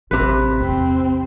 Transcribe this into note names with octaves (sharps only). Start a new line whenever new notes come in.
A1 C3 B4
E2 C4